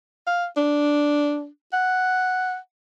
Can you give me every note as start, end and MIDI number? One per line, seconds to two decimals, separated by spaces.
0.27 0.46 77
0.56 1.46 62
1.73 2.57 78